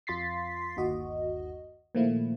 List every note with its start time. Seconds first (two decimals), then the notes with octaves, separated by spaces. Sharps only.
0.07 F2 F4 C6 A6 B6 C7
0.77 G1 D#2 D#3 F#4 D#5
1.95 A#2 D#3 F3 A3 E4